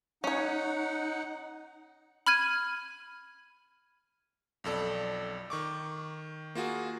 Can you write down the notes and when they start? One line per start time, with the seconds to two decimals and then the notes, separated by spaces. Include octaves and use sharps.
0.24 C#4 D#4 C#5 F#5
2.27 B5 F6 G#6 D#7
4.64 B1 F2 A4 D5
5.50 D#3 C#6 D6
6.55 A#3 F4 F#4 G#4